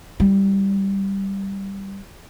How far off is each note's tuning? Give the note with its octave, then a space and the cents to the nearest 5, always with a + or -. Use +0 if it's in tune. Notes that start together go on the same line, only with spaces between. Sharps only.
G3 +0 E4 +0